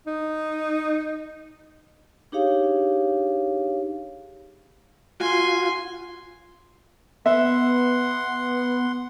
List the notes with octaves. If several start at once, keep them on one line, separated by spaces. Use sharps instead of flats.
D#4
D4 D#4 G4 G#4 C#5 F5
F4 F#4 G#5 C6
B3 E5 F#5 C6